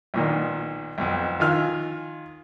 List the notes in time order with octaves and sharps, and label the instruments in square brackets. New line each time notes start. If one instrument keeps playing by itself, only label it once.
[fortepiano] B1 A#2 D#3
B1 F2
D#3 F4 G#5 F6